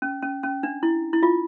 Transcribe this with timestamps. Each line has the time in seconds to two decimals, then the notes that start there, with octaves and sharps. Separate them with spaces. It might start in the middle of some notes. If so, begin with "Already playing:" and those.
0.02 C#4
0.22 C#4
0.43 C#4
0.63 D4
0.83 E4
1.13 E4
1.23 F4